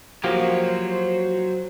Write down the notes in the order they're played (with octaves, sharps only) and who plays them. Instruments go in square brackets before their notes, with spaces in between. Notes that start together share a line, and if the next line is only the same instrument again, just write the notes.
[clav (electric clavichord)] F3 A#3 G4 [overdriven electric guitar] F#3 [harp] F#4 [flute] C5